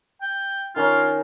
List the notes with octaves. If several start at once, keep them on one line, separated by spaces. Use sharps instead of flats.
G5
D#3 C#4 F4 A#4